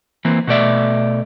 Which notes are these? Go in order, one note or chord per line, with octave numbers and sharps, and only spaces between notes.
E3 A#3 C4
B2 A3 D5 E5